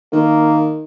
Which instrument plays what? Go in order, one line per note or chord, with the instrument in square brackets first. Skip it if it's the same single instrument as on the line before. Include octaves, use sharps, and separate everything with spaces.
[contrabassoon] D#3 [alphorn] A#3